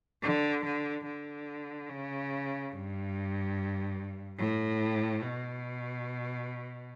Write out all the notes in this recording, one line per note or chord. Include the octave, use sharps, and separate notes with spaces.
D3
D3
D3
C#3
G2
A2
B2